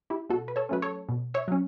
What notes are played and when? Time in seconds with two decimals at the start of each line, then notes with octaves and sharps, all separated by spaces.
0.10 E4 G4
0.29 B2 F#4 A4
0.48 B4
0.56 A4 C#5
0.69 F#3 A3 C#4 B4
0.82 A4 C#5
1.09 B2
1.34 C#5 E5
1.48 F#3 C#4